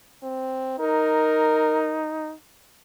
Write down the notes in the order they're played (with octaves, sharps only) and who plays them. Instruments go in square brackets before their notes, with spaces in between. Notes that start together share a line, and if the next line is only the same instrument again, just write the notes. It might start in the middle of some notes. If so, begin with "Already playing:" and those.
[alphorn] C4
[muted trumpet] D#4 [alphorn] A#4